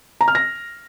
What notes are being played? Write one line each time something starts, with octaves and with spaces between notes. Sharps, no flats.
A#5
F6
A#6